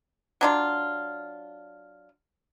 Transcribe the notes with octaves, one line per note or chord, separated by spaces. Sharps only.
F#3 D4 F4